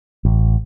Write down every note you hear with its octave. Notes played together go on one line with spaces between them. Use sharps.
A1